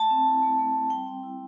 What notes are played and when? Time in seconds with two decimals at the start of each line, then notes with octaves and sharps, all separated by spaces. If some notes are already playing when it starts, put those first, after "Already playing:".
Already playing: A3 A5
0.10 C4
0.27 E4
0.43 A3
0.59 A3
0.74 C4
0.90 G3 G5
1.07 C4
1.23 E4